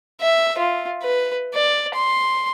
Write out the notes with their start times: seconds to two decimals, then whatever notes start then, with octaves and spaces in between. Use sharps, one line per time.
0.21 E5
0.58 F4
1.02 B4
1.54 D5
1.95 C6